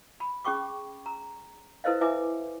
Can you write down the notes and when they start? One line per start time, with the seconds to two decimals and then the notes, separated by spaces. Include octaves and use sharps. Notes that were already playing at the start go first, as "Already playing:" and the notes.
0.20 B5
0.45 C#4 G#4 G5 C#6 D6
1.06 A#5
1.84 E4 A4 B4 C5 D#5 F5
2.01 E4 B4 E5 G#5 D6